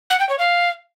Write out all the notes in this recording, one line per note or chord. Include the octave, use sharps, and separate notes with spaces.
F#5
G5
C#5
F5